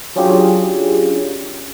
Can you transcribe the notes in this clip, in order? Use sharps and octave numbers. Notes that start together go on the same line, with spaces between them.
F#3 C#4 D4 F4 G4 G#4